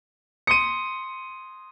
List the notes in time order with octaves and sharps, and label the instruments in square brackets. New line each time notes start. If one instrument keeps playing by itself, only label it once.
[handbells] C6 D#6 [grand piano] C#7 D#7